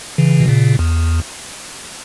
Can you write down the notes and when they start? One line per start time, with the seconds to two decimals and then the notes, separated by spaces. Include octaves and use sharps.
0.18 C#3 E3
0.40 B2
0.48 A#2 C#3
0.79 E2